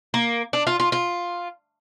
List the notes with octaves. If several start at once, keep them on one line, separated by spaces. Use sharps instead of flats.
A#3
D4
F4
F4
F4